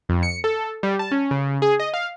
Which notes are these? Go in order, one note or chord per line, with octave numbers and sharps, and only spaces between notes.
F2
C#7
A4
G3
A5
C#4
C#3
G#4
D#5
F5